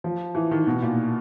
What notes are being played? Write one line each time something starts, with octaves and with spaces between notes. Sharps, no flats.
F3
E3
D#3
B2
A#2